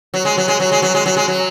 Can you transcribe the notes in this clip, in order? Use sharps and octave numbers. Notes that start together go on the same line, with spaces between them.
F#3
G#3
F#3
G#3
F#3
G#3
F#3
G#3
F#3
G#3
F#3